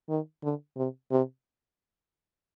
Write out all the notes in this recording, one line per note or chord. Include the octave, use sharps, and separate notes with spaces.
D#3
D3
C3
C3